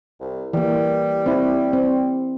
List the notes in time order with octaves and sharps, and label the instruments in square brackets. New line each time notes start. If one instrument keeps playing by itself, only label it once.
[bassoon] C2
[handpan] E3 A#3 [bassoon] G3
[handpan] C4 E4
C4